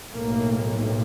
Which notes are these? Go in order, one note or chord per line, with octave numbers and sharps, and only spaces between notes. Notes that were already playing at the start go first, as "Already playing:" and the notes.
B1 A2 A#3